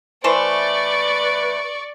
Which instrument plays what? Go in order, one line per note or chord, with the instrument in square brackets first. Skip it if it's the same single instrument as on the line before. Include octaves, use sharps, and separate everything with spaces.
[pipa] E3 A3 C5 [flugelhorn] B4 [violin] D5 C#6